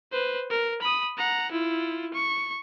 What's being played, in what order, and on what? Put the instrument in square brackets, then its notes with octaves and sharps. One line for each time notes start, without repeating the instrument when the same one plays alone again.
[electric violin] B4 C5
A#4
B5 D#6
F#5 A#5
E4 F4
C#6